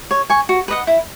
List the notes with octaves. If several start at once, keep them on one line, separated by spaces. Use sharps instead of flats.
C#5
G#5 C#6
F#4
B4 D#5 F#5
E4